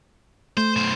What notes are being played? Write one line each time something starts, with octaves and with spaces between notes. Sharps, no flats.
A3 C5
B1 C5